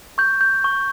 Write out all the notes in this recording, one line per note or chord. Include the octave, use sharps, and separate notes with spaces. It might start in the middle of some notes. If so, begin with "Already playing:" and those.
C#6 G6
G6
C#6